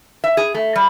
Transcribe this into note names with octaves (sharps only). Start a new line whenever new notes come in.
E5
G#4
A3
G3